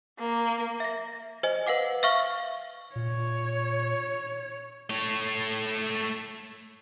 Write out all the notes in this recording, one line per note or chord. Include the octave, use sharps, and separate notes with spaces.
A#3
E5 A#6
C5 D#5 G#5
B4 F5 F#5 D6
E5 F5 C#6 F6 G7
A#2 C#5
A3 C#5